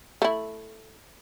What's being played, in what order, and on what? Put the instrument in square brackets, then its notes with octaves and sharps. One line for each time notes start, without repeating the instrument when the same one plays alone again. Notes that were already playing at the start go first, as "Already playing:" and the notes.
[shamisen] A3 E4